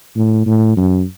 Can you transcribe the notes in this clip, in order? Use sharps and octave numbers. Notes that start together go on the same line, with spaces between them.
A2
A2
F#2